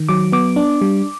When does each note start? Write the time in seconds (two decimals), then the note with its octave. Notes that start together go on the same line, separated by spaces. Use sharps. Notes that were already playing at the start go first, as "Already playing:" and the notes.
Already playing: D#3
0.09 F#3 D6
0.32 B3 D6
0.56 D4
0.81 G3